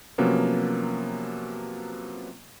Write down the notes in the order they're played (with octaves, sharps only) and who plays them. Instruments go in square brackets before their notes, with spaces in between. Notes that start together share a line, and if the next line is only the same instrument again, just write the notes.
[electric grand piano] C3 F3 F#3 A#3 B3 C#4